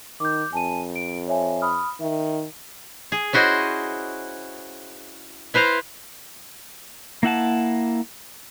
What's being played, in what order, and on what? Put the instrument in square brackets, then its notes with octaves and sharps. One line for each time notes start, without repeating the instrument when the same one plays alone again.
[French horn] D#3 [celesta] D6 G6
[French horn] F2 [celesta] G#5 A5 D#7
[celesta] D7
C#5 E5 G#5
B5 D#6 F6
[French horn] D#3 [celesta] E5
[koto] G#4
C#4 E4 F#4 C5 D#5
E4 B4 C5 F5 A#5
[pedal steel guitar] A#3 E4 F#5 A5